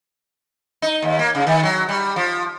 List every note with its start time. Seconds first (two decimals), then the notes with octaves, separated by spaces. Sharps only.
0.82 D#4
1.02 D#2
1.19 A#3
1.35 C#3
1.47 D#3
1.63 F#3
1.89 G3
2.16 F3